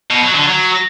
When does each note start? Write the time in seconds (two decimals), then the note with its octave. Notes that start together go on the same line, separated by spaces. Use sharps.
0.11 B2
0.23 F#3
0.35 D3
0.47 F#3